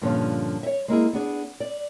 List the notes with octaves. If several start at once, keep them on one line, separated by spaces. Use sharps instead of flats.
G2 A#2 D3 F3 C#4
C#5 E5
G#3 A#3 E4 G#4
B3 D4 G#4
D5